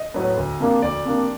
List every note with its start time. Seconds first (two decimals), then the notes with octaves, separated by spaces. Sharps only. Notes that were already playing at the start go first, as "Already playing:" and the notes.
Already playing: D#5
0.14 A2 F#3 B3
0.37 D2
0.60 C3 F3 A#3 D4
0.82 D2 D5
1.05 C3 F3 A#3 D4